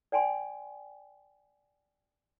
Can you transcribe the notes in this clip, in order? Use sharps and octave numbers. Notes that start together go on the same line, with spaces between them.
D5 G5 G#5 C6